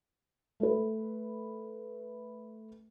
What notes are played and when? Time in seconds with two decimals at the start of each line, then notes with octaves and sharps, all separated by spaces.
0.60 A3 A4 B4